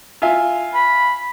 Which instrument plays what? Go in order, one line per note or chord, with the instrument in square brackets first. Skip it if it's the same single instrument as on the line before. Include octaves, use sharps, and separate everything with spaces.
[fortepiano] F4 E5 G#5
[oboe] B5